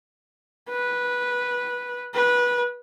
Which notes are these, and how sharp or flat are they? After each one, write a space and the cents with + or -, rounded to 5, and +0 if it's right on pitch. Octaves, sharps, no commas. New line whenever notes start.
B4 -10
B4 -20